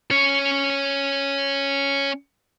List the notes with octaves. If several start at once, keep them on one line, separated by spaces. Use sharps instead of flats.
C#4 C#5